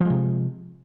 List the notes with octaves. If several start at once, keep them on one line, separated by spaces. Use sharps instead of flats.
C3 F3 G#3